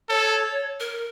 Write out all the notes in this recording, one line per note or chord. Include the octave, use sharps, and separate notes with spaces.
A4 C#5
A#4